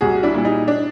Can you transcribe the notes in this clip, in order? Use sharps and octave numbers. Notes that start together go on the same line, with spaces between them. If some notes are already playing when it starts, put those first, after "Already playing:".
C2 F#4 G#4
D4 E4
A#2 G3
D#4
D4